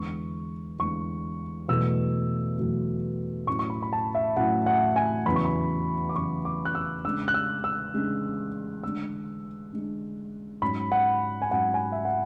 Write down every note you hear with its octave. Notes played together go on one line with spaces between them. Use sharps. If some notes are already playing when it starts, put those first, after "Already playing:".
Already playing: E2 D3 G#3 C#6
E2 D3 G#3 C#6
E2 B2 F#3 A3 E6
E2 B2 F#3 A3
A2 F#3 C#4 E4 C#6
C#6
B5
B5
A5
E5
A2 F#3 C#4 E4 F#5
F#5
G#5
E2 C#3 F#3 B5
C#6
B5
D6
E2 C#3 F#3 C#6
D6
F#6
E6
C#3 G#3 D4 E6
F#6
E6
E6
C#3 G#3 D4
D3 G#3 D4 E6
D3 G#3 D4
G#2 F#3 C#4 B5
F#5
G#5
G#2 F#3 C#4 F#5
G#5
E5
F#5